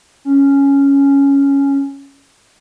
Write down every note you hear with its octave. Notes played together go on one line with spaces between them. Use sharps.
C#4